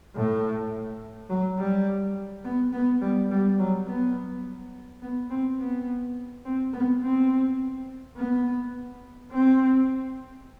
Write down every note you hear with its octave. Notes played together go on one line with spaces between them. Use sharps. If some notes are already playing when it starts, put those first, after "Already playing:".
A2
F#3
G3
B3
B3
G3
G3
F#3
B3
B3
C4
B3
C4
B3
C4
B3
C4